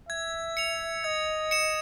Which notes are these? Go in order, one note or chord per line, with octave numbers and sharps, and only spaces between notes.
E5 G#6
C#7 F7
D#5 G#6
C#7 E7